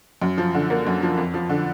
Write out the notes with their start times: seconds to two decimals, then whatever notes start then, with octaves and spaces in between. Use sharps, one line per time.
0.22 F#2
0.38 F3
0.54 D3
0.70 A#3
0.87 F#2
1.03 F3
1.17 F2
1.34 F3
1.49 D3